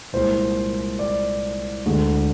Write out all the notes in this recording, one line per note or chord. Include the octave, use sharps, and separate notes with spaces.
C2 A#2 G#3 C5
D5
D2 D3 G#3